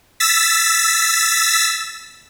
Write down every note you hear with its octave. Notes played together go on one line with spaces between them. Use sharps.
E6 A6 B6